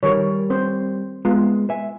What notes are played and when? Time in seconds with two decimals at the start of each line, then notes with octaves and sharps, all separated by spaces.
0.03 D#3 G3 A#4 C#5
0.50 C4 C5
1.25 G#3 B3 F4
1.70 E5 G#5